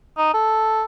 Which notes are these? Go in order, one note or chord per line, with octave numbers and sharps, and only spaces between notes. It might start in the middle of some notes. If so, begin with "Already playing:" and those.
D#4
A4